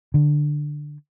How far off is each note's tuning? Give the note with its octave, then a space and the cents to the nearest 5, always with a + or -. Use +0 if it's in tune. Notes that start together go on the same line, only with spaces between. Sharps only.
D3 +10